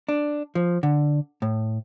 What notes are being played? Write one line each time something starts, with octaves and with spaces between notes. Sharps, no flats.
D4
F3
D3
A2